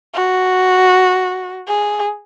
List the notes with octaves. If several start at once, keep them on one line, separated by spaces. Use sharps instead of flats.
F#4
G#4